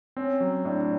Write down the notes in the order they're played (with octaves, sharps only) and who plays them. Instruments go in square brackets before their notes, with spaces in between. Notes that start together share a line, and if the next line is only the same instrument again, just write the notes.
[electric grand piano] C4 [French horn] C#4
[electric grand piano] F#3
[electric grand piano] A2 [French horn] D4